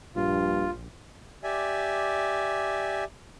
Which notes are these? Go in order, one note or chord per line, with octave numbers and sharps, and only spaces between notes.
A#1 G2 F4
G4 D5 E5 G#5